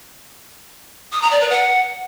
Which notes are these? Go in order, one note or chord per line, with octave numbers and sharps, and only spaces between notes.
D#6
A#5
D5
B4
F#5